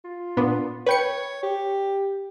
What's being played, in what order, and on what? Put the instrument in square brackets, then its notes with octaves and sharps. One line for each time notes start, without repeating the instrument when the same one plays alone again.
[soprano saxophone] F4
[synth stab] A#2 B3 D4
[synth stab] B4 G5 C#7 [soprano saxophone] C#5
[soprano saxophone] G4